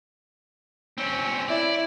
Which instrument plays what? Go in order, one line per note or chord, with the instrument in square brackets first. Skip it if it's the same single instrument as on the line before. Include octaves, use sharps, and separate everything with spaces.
[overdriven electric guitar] C4 C#4
[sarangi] E4 [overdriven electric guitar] D5